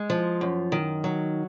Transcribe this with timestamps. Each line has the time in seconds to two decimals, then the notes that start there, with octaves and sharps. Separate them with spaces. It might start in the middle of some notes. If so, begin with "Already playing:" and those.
Already playing: G#3
0.10 F3
0.41 F#2
0.72 D#3
1.04 F#3